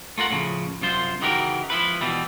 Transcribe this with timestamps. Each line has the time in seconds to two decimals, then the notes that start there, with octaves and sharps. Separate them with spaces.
0.18 A3 F4 A#4 F#5
0.31 A2 C#3 F3
0.81 C2 F#2 F4 C5
1.22 C#3 E3 D#4 F#4 G4 A#4
1.70 F3 E4 B4
2.01 B2 E3 G3